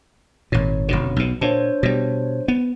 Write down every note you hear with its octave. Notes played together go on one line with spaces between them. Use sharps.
G#1 A#2 C#5
F1 B2 D3
B1 B2
A#2 D4 C5 C#5
B2 G3
B3